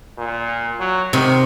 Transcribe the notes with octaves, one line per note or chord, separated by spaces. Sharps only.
A#2
F#3
C3 D#3